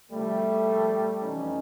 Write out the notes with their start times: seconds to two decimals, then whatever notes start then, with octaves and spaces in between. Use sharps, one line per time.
0.11 D2 C3 F3 G3 A3
0.67 C2 A#2 F3
1.22 F2 C3 E3 C#4 D#4